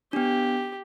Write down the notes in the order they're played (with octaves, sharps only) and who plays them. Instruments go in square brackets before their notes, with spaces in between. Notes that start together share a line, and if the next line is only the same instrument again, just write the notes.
[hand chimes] B3 D4 [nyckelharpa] G4